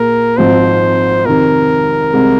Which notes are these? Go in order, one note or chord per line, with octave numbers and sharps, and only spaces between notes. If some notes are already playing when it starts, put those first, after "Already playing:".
Already playing: A#2 A#3 G#4 A#4
G#1 G#2 F3 C4 D#4 C5
F2 C3 D#3 A#4
C2 C3 G#3